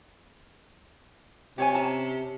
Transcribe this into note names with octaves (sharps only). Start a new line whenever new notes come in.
C3 G4 C#5 G#5
C#4 A5 A#5